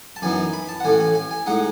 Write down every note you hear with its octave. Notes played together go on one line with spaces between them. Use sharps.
A5
F#2 E3 B3 D#4 G#5
B5
A5
F#5
A1 A2 E3 A3 G#5
G#5
G#5
G#5
A2 G#3 D#4 F#5